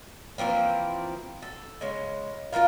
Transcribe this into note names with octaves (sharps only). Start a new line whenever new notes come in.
E3 F3 A#3 C4
A4
C#3 G#3
F4 F#4 A#4 F5